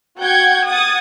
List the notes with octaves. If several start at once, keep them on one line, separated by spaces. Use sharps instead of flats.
F#4 F#5 G5 G6 G#6 C#7
F#5 D#6 G#6 A6